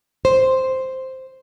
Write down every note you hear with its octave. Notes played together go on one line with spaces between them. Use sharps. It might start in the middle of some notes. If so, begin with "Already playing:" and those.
C5